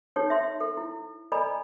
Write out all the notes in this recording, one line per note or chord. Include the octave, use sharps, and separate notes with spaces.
D#4 G4 A4 C#5
E5 C6
A4
E4
A4 D5 D#5 G#5 A#5 B5